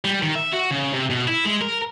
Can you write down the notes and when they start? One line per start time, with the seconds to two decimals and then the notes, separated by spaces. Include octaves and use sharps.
0.05 G3
0.23 D#3
0.35 E5
0.53 F#4
0.71 C#3
0.94 C3
1.10 B2
1.28 E4
1.45 G#3
1.61 A#4